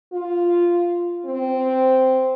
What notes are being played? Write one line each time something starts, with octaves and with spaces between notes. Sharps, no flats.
F4
C4